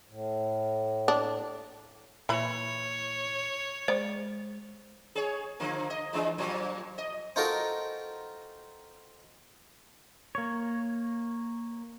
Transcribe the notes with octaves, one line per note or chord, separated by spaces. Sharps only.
A2
D4
A#2 E3 C#5 B5
G#3 C5 D5
G#4 C#5
D3 F3 A#3
D#5
E3 G#3 D4
A#2 F3 F#3
D#5
C4 D#4 F4 F#4 A4 A#4
A#3 C#5